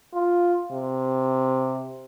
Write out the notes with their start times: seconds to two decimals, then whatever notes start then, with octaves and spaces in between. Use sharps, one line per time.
0.14 F4
0.72 C3